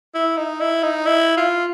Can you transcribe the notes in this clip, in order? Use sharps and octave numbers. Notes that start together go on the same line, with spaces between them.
E4
D#4
E4
D#4
E4
F4